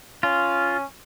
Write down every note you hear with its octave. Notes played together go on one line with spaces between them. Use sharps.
C#4 F4